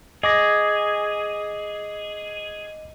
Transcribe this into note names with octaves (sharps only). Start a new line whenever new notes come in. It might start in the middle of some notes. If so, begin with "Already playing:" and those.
G#4 D#5 D6 A#6